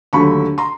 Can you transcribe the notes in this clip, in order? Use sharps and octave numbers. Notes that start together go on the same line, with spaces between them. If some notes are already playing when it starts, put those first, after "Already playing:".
D#2 D3 F#3 A3 B5 C#6
A#5 C6